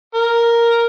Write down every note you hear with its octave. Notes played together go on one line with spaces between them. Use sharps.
A#4